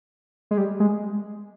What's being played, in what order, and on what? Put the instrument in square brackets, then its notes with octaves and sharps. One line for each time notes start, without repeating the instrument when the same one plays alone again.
[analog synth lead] G#3
G3
G#3